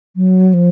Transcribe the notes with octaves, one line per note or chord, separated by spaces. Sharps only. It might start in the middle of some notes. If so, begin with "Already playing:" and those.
F#3
F3